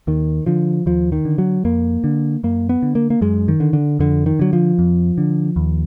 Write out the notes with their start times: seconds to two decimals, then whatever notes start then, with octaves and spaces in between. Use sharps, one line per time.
0.07 D#2 D#3
0.46 D3 F3
0.86 D#2 F3
1.12 D#3
1.25 D3
1.38 F#3
1.65 F2 A#3
2.04 D3
2.43 F#2 A#3
2.69 B3
2.82 D3
2.95 A#3
3.10 A#3
3.21 F#2 G#3
3.48 D#3
3.60 D3
3.73 D3
3.99 F2 D3
4.26 D#3
4.39 D3 F#3
4.53 F3
4.79 F2
5.18 D3
5.56 D#2